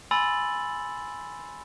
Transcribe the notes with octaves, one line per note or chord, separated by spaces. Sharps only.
G#5 B5 C6 E6 A6 F#7